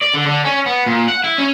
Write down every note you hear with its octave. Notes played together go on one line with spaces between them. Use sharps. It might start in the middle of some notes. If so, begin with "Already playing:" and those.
D5
D3
D3
C#4
B3
A#2
F#5
E4
C#4